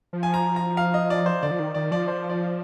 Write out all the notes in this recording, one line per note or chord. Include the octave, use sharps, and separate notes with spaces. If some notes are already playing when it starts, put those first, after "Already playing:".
F3
G#5
A#5
A#5
F5
D#5
D5
C5
D3 D5
F3
D#3
D#3 D5
F3 D5
C5
D5